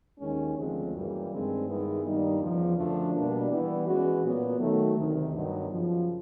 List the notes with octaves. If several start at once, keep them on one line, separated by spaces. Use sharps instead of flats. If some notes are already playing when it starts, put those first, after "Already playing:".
D#2 D#3 G#3 C#4
D2 C#3 F3 G#3 C4
F#2 C#3 E3 G3 A#3
G2 D#3 G#3 C4
G2 D#3 G#3 B3 E4
G2 D#3 G3 A#3 D#4
E2 C#3 F3
F#2 D3 F3 A3 D4
B2 G3 A#3 D4
E3 G3 B3 E4
E3 G#3 C#4 F#4
A#2 F#3 B3
D#3 F#3 A3
D2 C3 D#3
G2 D#3 F#3 B3 D#4
F#2 C#3 F3